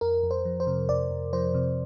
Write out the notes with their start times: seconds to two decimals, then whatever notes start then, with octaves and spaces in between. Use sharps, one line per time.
0.01 F2 A#4
0.24 F2
0.31 C5
0.45 F3
0.60 C5
0.67 C3
0.89 F2 D5
1.11 F2
1.33 F3 C5
1.54 C3